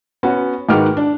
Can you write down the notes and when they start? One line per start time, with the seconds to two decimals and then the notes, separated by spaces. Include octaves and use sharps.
0.23 B3 C#4 F#4
0.69 G#2 D#3 F#4 B4 D6 F6
0.97 D4